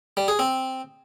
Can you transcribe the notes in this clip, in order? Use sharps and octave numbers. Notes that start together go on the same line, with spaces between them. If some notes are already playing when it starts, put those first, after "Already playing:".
G3
G#4
C4